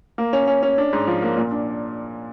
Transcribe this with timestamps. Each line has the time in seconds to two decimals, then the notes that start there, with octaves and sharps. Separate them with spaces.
0.18 A#3
0.33 C#4
0.47 C#4
0.63 C#4
0.78 D4
0.93 G#2
1.07 F3
1.22 A#3
1.37 A#2
1.51 D4